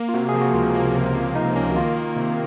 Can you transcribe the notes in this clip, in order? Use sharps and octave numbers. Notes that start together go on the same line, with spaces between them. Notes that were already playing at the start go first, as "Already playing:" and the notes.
Already playing: A#3
F4
C3 F#4
G#4
F3
F#4
C#2 F4
A#3
C3
F3
C#2 D#4
A#3 C#4
F#4
D#3 F4
A#3
C3